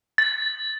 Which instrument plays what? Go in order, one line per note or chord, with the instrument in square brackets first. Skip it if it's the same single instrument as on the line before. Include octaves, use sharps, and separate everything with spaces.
[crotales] A6